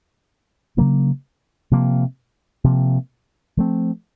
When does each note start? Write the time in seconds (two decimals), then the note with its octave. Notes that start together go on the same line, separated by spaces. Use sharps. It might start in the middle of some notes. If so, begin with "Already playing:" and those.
0.77 C#3 F#3 A#3 D4
1.71 C3 F3 A#3
2.64 C3 F3 A#3
3.57 F3 A3 C4